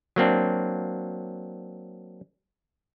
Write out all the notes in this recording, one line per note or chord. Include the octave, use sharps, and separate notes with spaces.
F#3 A#3 C4 D4